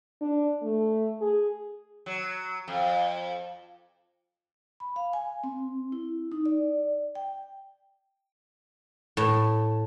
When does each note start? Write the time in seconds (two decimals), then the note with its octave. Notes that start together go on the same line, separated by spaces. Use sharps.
0.22 D4
0.62 A3
1.21 G#4
2.06 F#3
2.68 F2
4.80 B5
4.96 F5
5.13 G#5
5.44 C4
5.92 E4
6.32 D#4
6.46 D5
7.15 G5
9.17 A2